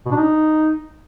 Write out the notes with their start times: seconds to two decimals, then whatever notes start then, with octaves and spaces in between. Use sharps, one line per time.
0.06 B2
0.11 D4
0.17 D#4